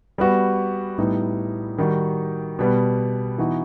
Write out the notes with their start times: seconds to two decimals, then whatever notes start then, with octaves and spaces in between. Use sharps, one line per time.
0.18 G3 B3 F#4
0.98 A2 G3 B3 D#4
1.78 D#3 G3 D#4 F#4
2.59 B2 G3 B3
3.38 E3 B3 D#4 F#4